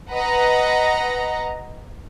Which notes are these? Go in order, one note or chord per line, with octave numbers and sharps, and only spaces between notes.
B4 D#5 F#5 A#5